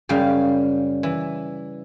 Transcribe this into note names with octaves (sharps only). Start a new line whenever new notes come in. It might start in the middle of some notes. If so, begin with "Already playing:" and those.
F#2 C#3 G3 F5
E3